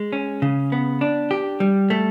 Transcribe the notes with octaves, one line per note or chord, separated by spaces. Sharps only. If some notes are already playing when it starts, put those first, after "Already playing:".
Already playing: G#3
C#4
C#3
B3
D4
G4
G3
A3